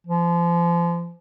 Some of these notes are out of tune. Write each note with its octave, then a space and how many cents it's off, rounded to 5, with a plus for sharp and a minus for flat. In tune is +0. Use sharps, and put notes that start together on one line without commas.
F3 -30